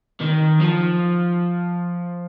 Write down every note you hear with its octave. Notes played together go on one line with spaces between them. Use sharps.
D#3
F3